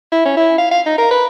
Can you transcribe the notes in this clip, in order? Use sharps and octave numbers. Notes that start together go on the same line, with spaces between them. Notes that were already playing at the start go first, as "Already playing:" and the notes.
E4
C#4
E4
F5
F5
D#4
A#4
B4